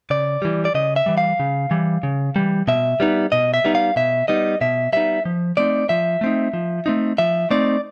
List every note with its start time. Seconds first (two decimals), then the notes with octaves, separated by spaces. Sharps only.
0.10 C#3 D5
0.42 E3 G3
0.65 D5
0.75 C#3 D#5
0.96 E5
1.06 E3 G3
1.18 F5
1.40 C#3
1.71 E3 G3
2.03 C#3
2.36 E3 G3
2.68 B2 E5
3.00 G3 B3 D#4
3.32 B2 D#5
3.54 E5
3.64 G3 B3 D#4
3.75 F5
3.96 B2 E5
4.28 G3 B3 D#4 D#5
4.61 B2 E5
4.93 G3 B3 D#4 E5
5.25 F3
5.57 A3 C4 D#4 D5
5.89 F3 E5
6.21 A3 C4 D#4
6.54 F3
6.86 A3 C4 D#4
7.18 F3 E5
7.51 A3 C4 D#4 D5